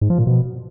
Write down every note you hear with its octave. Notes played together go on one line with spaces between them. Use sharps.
G#2
F3
A#2
B2